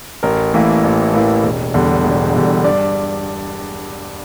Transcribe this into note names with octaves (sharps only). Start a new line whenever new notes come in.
A1 A#4
A2 E3 A#3
A1
A2 E3 A#3
E1
E2 D3 G3
E1
E2 D3 G3
G2 D5